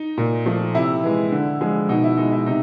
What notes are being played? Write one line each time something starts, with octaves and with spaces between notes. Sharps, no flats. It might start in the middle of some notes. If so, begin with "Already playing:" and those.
Already playing: D#4
A#2
F3 A3
C3 E4
E3 G#3
D3
F3 G#3
B2 D#4
E4
G#3 D#4
E4
C3 D#4